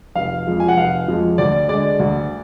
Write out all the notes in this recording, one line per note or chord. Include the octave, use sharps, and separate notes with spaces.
F1 F5
F2 F3 G#3
G#5
F#5
F1 F5
F2 F3 G#3
D2 D5
D3 G#3 D5
D2